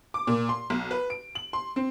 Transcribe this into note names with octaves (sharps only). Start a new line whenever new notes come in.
D6
A#2
C6
B1
B4
D7
F#7
C6
C4